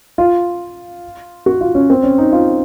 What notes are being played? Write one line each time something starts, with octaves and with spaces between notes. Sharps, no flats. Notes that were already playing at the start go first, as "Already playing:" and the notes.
F4
F#4
F4
C#4
C4
C#4
D#4
F4